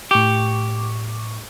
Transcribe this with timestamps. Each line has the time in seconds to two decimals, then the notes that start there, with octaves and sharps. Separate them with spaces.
0.11 A2 G4 C#6 D6